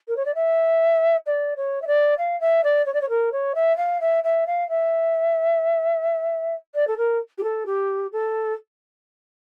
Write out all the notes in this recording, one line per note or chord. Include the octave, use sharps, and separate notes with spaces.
A#4
C#5
D5
E5
D5
C#5
E5
D5
F5
E5
D5
C#5
D5
C#5
A#4
C#5
E5
F5
E5
E5
F5
E5
D5
A4
A#4
G4
A4
G4
A4